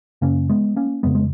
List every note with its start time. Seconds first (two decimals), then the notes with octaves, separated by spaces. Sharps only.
0.22 F#2 C#3 A#3 C#4
0.50 G#3 B3
0.76 A#3 C#4
1.03 F2 C#3 G#3 B3
1.15 G#3